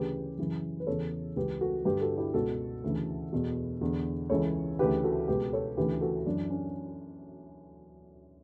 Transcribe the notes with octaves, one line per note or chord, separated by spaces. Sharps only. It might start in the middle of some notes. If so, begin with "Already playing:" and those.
Already playing: D2 C#3 E3 G4 B4
F#2 C#3 E3
B4
E2 C#3 E3 A4 C#5
C#2 C#3 E3 G4 B4
F#4 A4
G2 D3 G4 B4
F#4 A4
E4 G4
C#2 B2 F#4 A4
D2 C#3 E3
E2 B2
E2 D3
C#2 C#3 E3 A4 C#5
D2 C#3 E3 G4 B4
F#4 A4
C#2 B2 G4 B4
A4 C#5
D2 C#3 E3 G4 B4
F#4 A4
F#2 E3 D4
C#4